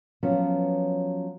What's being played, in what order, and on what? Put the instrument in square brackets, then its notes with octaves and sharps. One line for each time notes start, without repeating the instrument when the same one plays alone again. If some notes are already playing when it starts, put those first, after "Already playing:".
[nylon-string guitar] F3 F#3 B3 C#4